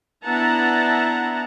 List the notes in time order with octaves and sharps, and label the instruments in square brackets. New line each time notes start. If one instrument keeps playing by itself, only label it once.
[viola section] B3 D4 E4 F#5 A5 A#5